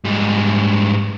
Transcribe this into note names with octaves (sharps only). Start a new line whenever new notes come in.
G#2 G3